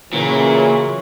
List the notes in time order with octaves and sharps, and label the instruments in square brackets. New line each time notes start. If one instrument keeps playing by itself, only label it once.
[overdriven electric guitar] A#2 [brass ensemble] C#3 E3 F#3